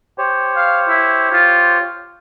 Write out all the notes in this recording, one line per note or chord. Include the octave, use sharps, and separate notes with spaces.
G4 C5 C#5
F5
E4
F4